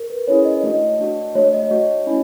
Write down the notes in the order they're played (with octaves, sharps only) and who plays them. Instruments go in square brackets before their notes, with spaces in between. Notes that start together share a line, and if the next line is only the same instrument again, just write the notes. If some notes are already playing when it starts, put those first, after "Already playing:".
Already playing: [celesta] A#4
B4
[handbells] C#4 E4 G#4 [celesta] C#5
[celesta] D#5
[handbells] A3 D4 F#4 [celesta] D#5
[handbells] A3 D4 F#4
[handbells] A3 D4 F#4 [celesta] C#5
[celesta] D#5
[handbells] A3 D4 F#4
C#4 E4